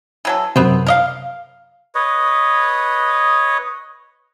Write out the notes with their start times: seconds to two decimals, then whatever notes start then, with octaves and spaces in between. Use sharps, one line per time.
0.25 E3 F#3 A4
0.56 F#2 C3 B3 C4
0.87 A#4 D#5 F5
1.95 B4 C#5 D#5